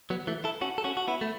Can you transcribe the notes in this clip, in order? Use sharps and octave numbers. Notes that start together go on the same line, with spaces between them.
F#3 B3
E3 A3
E4 A4
C#4 F#4
A4
C#4 F#4
F#4
B3 E4
A3